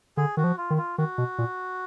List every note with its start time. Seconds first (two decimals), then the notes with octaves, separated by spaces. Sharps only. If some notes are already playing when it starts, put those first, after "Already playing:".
0.17 D3 G#4
0.37 D#3 F#4
0.44 F3
0.58 F4
0.70 D#3
0.78 F4
0.98 D#3 F#4
1.18 B2
1.38 A#2